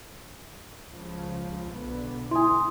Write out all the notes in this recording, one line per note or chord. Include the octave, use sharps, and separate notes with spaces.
C#2 C#3 F3
B1 D3 B3
E4 G#5 C6 D#6